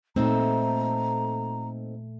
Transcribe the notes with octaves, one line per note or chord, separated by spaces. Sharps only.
A#2 A3 C4 D#4 A4 A#5